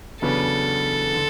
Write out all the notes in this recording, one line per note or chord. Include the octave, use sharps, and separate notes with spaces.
E2 C#3 F#3 B3 D4 A4
D3